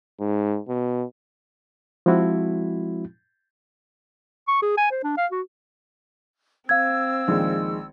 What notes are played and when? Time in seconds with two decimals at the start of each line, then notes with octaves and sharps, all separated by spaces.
0.20 G#2
0.69 B2
2.06 F3 G#3 C4 E4 F#4
4.48 C#6
4.62 G#4
4.78 G#5
4.91 C5
5.04 D4
5.17 F5
5.32 F#4
6.69 C4 F5 E6 G#6
7.28 A#1 D#3 G#3